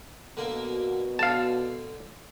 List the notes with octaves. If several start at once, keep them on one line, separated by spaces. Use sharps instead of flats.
B2 D3 A#3
D3 F5 A5